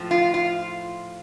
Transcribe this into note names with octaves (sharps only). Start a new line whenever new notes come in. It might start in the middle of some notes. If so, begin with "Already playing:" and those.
Already playing: A2 F3
F4
F4